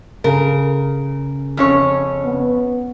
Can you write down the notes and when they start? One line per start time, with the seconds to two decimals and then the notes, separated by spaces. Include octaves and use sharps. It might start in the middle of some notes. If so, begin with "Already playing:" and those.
0.24 C#3 A#4
1.57 F2 C#4 C#5
2.25 B3